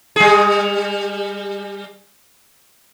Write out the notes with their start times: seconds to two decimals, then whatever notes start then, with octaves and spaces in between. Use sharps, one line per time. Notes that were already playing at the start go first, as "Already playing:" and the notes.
0.16 G3 G#4